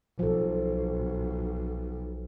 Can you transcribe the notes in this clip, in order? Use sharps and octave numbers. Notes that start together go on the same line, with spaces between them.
B1 F3 A4